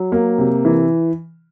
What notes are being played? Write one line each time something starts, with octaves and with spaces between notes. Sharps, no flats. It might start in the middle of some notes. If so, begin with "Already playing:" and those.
Already playing: F#3
A#3
C3
E3